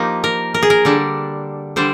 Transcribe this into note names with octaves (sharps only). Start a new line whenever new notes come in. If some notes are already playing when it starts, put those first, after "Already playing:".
Already playing: F3 A#3 D#4 G4
A#4
A#4
G#4
A#4
D3 G3 D4
D3 G3 D4 C5